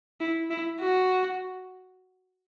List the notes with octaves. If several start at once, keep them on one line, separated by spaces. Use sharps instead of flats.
E4
E4
F#4